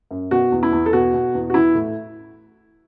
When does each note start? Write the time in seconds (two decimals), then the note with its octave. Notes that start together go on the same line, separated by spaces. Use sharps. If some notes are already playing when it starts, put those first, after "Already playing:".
0.11 F#2
0.31 B2 F#4
0.52 E2
0.63 E4
0.72 E2
0.86 A4
0.93 B2 F#4
1.14 B2
1.35 E2
1.50 F#4
1.54 E3 E4
1.75 A2